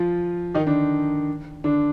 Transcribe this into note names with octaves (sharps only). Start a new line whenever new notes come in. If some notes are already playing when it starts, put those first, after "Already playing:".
Already playing: F3 F4
D#3 D#4
D3 D4
D3 D4